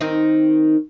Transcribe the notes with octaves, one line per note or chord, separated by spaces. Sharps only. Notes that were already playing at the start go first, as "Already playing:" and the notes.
D#3 C4 D#4